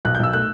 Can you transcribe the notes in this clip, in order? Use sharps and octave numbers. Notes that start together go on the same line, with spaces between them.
B1 F#6
G6
B1 E6
A3 F#6